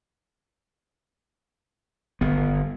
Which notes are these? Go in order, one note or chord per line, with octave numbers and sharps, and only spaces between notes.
G1 B3